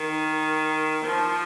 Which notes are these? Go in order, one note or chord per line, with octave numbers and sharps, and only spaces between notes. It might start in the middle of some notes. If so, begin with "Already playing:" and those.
Already playing: D#3
F3